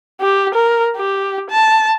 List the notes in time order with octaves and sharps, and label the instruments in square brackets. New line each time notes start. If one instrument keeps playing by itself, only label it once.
[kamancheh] G4
A#4
G4
A5